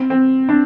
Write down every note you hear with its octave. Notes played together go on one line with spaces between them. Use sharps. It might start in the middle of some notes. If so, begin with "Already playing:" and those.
Already playing: C4
C4
D4